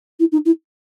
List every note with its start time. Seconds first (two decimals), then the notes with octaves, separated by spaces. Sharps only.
0.19 E4
0.32 D#4
0.45 E4